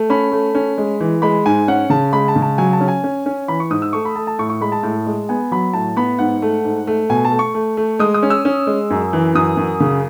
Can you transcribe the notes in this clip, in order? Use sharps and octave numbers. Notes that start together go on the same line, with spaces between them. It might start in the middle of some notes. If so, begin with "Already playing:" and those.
Already playing: A3
C#4 B5
A3
C#4
G#3
E3
G#3 B5
G#2 G#5
C#4 F#5
C#3 A5
G#3 B5
A5
C#3
A5
F#3 G#5
A5
C#4
G#5
C#4
C#4
E3 B5
C#6
G#2 D#6
E6
A3 C#6
B5
A3 A5
A5
A2 C#6
C#6
G#3 B5
A5
A2
G#3
B3 G#5
F#3 B5
A2 A5
B3 B5
G#2 F#5
A3
G#2
A3
B2 G#5
A5
A3
C#6
A3
A3
G#3 D#6
D#6
C#4
E6
C#4
G#3
F#2
E3
F#2 D#6
F#2
C#3